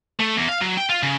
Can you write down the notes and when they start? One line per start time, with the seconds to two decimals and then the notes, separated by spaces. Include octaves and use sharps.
0.19 A3
0.36 E2
0.48 F5
0.61 F#3
0.77 G5
0.89 F4
1.03 C#3